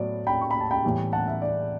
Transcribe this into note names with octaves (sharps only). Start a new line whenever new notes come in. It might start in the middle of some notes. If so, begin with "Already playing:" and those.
Already playing: A2 F#3 B3 D5
G5 B5
C#6
B5
A5
G5 B5
A2 E3 G3 B3
F#5 A5
E5
D5